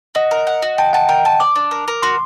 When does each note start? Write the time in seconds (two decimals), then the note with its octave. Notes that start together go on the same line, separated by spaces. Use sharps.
0.15 F#4 D#5
0.31 A#4
0.47 F#5
0.62 F#4
0.78 G5 A5
0.93 F#5 A5
1.09 A#4 G5
1.25 A5
1.40 D5 D6
1.56 D4
1.71 A#4
1.88 A#4
2.02 F#4 C6